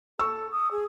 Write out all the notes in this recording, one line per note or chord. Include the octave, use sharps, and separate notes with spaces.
A4 C#6 E6
D#6
G#4